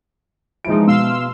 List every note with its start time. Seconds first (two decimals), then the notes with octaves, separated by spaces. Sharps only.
0.65 E3 F3 G#3 D#4 D7
0.87 B2 F5 C6 E6